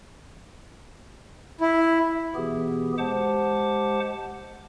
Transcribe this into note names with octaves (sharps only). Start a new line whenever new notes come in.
E4
B2 E3 B3 G4 G#4
G#3 G4 C5 F#5 A5 D6